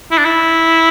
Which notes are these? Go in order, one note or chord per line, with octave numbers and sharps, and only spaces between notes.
E4
D4
E4